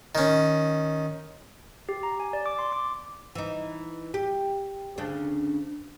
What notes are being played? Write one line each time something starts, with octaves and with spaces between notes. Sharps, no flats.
D#3 C#4
G4
A#5
G#5
D5
D6
C6
D6
E3 D#4
G4
D2 C#3 D4